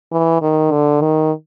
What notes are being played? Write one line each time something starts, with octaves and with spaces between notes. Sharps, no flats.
E3
D#3
D3
D#3